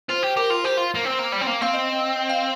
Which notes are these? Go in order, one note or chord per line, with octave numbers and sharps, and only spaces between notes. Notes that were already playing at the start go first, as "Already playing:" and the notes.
F4 C5
G4
G4 A#4
F4
G4 C5
F4
A#3
C4
A#3
G3
C4
A#3
C4 F5
D#5
F5